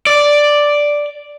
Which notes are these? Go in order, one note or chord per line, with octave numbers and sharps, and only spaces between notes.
D5